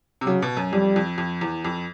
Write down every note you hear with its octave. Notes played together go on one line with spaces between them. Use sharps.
C3
C#3 F#3
B2
F#2
F2 G3
F2
F2
E2
F2